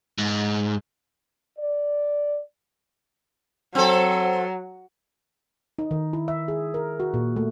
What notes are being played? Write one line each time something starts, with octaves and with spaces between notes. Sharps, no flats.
G#2
D5
F#3 C4 A4
D#4
D#3
E4
E5
G#4
A#4
F#4
A#2
A3